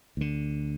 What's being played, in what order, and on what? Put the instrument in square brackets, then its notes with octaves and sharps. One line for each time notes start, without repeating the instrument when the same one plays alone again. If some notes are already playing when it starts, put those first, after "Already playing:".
[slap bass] D2 D3